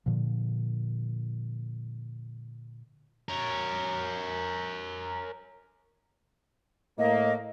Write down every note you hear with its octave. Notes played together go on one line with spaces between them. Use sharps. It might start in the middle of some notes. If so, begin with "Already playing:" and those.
A#2 D3 F3
A#4 C#5
A2 A3 A#3 D#5